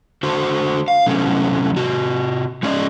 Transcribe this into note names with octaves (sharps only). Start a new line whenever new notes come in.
D3 F#4 C5
F5
C3 F#3 A3 B3 C#4 D#4
C3 F#4
G#3 C#4 D#4 G#4 D5 D#5